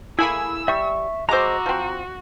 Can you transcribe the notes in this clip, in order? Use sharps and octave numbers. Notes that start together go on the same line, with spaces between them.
A3 A#3 E4 G#4 G#5 B5 E6
G3 E5 C#6
G#3 F#4 C5 A#5 D6 E6 A#6
F3 C4